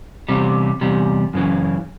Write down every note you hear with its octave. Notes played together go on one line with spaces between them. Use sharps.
E2 C3 G3
E2 C3 G3
F#2 C#3 E3